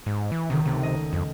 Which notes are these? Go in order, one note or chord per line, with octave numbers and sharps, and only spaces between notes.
G#2
E3
C#2 C3 D#3
C3 A3
D#5
F2